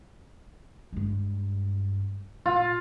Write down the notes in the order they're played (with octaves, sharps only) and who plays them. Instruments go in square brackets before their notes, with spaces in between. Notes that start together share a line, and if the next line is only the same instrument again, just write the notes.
[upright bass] G2 G#3
[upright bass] A#2 [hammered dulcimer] F4